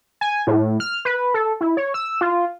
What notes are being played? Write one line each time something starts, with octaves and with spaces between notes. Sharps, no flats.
G#5
A2
F6
B4
A4
E4
C#5
E6
F4